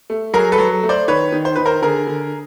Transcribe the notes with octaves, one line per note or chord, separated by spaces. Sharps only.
A3
F#3 G#4 A#4
A4 B4
F#3
A3
C5 D5
D#3 B4 C#5
D#3
C5
D#3 B4
A#4 C5
D3 G#4 A#4
D3